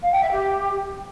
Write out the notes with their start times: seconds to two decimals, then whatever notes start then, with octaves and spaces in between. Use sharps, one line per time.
0.02 F5
0.12 G5
0.21 E5
0.31 G4